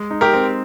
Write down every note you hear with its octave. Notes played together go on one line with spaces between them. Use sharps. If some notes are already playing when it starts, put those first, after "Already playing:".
Already playing: G#3
D#4
G4 A#4
C4